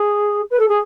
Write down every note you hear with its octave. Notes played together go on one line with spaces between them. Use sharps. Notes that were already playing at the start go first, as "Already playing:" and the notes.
Already playing: G#4
B4
A4
G#4